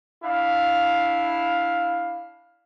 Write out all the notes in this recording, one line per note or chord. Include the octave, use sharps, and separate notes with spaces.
D4 E4 F5